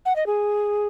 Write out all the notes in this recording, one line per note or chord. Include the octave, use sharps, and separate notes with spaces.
F#5
D#5
G#4